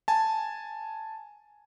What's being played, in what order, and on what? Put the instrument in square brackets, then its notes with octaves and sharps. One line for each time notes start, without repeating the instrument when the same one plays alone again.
[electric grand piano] G#5 A5